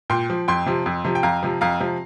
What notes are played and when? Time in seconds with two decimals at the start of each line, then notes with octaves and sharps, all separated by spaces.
0.10 A#2 G5 C6
0.30 F3
0.48 F2 G5 C6
0.66 C3 F3
0.86 F2
1.04 C3 F3
1.15 G5
1.23 F2 F5 A#5
1.43 C3 F3
1.61 F2 F5 A#5
1.80 C3 F3